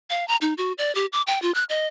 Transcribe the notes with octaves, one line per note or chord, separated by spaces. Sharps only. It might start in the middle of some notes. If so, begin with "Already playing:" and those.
F5
A#5
D#4
F#4
D5
G4
D6
G5
F4
F#6
D#5